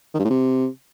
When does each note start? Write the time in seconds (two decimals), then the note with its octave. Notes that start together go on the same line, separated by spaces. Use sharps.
0.14 D#3
0.19 G2
0.25 A2
0.30 C3